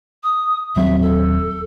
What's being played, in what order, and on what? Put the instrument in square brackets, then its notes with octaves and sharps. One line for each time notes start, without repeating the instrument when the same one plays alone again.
[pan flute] D#6
[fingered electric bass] D#1 F#3 C4 [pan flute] E5
[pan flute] A4